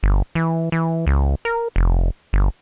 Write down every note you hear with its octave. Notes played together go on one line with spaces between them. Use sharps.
G1
E3
E3
C#2
A#4
F1
G1